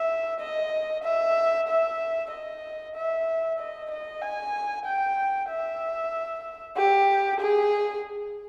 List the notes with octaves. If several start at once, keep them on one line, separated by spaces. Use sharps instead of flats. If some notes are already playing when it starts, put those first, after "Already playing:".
Already playing: E5
D#5
E5
E5
D#5
E5
D#5
D#5
G#5
G5
E5
G4
G#4